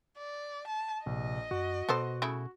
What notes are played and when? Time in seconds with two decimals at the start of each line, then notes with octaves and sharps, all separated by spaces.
0.18 D5
0.67 A5
1.06 A#1 C3 D#5
1.51 F#2 F#4
1.89 B2 B3 A4 C5
2.22 C#3 A3 E4